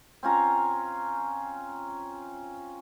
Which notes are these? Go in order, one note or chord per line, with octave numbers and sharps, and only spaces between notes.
C4 C#4 F4 A#5